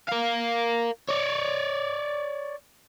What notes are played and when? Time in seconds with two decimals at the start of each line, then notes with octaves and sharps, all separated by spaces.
0.08 A#4 F5
1.09 C#5 D5